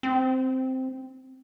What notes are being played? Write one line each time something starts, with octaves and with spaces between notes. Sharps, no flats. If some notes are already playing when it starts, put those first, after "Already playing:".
C4